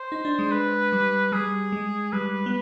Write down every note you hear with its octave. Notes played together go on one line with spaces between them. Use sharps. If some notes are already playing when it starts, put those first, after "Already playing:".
Already playing: C5
D#4
D4
G#3
B4
G3
G3 G#4
G#3
G3 B4
B3